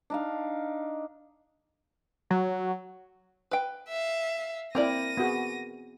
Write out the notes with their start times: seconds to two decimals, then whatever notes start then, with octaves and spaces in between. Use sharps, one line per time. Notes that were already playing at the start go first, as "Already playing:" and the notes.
0.10 D4 D#4 F5
2.30 F#3
3.51 B4 G5
3.88 E5 F5
4.75 A#3 C4 E4 A#4 D5 A#6 D#7
5.17 B3 F#4 G#4